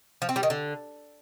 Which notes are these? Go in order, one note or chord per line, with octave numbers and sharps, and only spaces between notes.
F3
C4
G3
D#3
D3